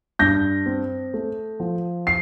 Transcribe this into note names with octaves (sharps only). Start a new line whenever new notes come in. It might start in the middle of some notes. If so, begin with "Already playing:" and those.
G2 G6 A#6
C4
A3
F3
C7